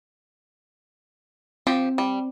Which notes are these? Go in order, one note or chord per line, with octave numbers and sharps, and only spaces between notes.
F3 C4 G4
G3